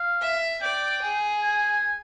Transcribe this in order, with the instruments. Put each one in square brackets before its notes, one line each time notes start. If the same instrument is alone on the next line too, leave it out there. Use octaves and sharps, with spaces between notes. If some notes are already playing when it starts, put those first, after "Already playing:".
Already playing: [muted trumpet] F5
[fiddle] E5
[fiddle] D5 [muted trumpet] G5
[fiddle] G#4
[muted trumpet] G#5